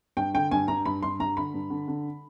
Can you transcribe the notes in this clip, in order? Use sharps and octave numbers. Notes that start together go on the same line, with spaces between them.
G2 G5
D3 G5
G2 G#5
G2 A#5
G2 B5
G2 C6
G2 A#5
D3 B5
G2
D3
D3